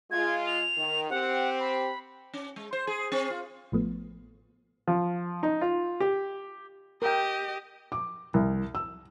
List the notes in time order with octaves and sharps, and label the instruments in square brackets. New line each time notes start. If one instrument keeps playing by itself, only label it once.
[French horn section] G#3 F4 [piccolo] G#6
[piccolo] F7
[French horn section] D#3
[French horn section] C4 G4 [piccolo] F#5
[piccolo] B5
[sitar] C#4
G#3
C5
G#4
C4
F4
[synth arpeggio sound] A1 F3 A3 B3
[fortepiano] F3
D#4
F4
G4
[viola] G4 D#5 [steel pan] A#4 G5
[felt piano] D6
C2
E6